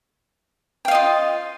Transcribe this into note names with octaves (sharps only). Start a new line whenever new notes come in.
F4 D#5 F5 G5